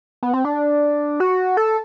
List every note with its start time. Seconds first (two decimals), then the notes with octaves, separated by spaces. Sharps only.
0.23 B3
0.33 C4
0.45 D4
1.20 F#4
1.57 A4